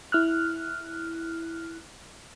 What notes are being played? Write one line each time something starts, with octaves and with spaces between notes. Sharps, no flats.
E4 F6 F#6